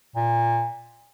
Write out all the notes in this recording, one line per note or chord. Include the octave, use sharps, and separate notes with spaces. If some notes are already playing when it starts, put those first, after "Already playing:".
A#2